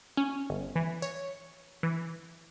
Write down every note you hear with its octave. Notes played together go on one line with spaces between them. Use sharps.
C#4
G1
E3
C#5
E3